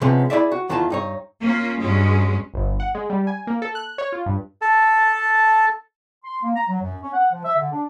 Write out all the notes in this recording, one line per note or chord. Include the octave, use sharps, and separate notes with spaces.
C3 F3 G#3 B3 C#4
E4 F4 G#4 D5 E5
F#4
E2 D#3 G#3 E4 F4 A5
G2 D#4 C#5
A#3 C#4 F4
G2 F#3 G#3 C#4
G1
F#5
G#3
G3
G#5
A#3
A4
F#6
C#5
F4
G2
A4 A5
C6
A#3
A#5
F#3
F#2
C#4
F#5
F3
E5
D3
D4